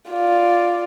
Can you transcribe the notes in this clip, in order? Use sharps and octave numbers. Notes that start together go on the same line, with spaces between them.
F4 D5